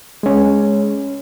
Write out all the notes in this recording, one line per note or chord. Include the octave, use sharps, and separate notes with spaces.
G#3 C#4